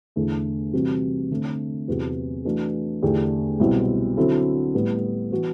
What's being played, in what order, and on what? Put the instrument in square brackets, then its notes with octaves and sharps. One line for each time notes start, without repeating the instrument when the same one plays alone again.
[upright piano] E2 D3 A3
C3 E3 G3 C4 F#4
D3 A3 C4
E2 C3 F#3 B3 F#4
E3 A3 D4 F#4
E2 D3 A3 D4 G4
C2 B2 F#3 C4 E4
D3 F#3 C4 E4 A4
A2 G3 B3
E3 B3 F#4